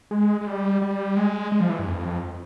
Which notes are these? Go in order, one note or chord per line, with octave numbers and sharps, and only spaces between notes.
G#3
G#3
G3
G3
G#3
G#3
F3
E3
G2
F2